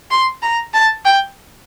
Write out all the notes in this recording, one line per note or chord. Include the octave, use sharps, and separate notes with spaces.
C6
A#5
A5
G5